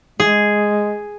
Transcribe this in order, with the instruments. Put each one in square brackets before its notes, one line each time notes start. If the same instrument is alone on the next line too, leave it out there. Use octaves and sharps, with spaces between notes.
[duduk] G#3 [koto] G#4